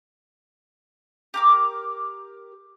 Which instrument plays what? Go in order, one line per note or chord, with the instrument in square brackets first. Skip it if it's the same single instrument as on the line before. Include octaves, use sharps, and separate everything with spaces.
[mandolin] G4 A#4 D6